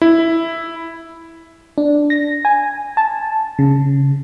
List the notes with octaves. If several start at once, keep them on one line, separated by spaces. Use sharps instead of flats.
E4
D4
A#6
G#5
A5
C#3